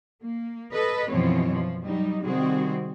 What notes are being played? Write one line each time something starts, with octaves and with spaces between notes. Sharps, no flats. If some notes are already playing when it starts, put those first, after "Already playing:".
A#3
A4 B4 D#5
F#2 B2 E3 F3 C4 C#5
F3
F#3 G3 D#4
C3 D#3 G3 C4 F#4 G#4